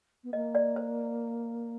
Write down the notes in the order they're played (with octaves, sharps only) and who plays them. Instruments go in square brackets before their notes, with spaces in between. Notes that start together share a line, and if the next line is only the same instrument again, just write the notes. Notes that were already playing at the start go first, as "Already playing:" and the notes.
[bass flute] B3
[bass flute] A#3 [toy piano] D#5
[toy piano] D5
C5